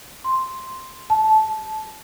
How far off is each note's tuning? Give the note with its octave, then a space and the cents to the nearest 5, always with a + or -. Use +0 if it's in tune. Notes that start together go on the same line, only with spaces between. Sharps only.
C6 +0
A5 -15